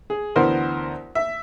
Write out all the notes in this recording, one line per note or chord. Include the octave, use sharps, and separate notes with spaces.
G#4
D2 E3 B3 A#4 C5 C6
E5